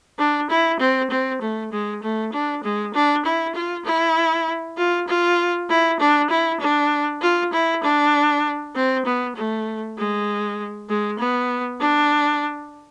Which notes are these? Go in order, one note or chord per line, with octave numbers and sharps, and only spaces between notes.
D4
E4
C4
C4
A3
G#3
A3
D4
G#3
D4
E4
F4
E4
F4
F4
E4
D4
E4
D4
F4
E4
D4
C4
B3
A3
G#3
G#3
B3
D4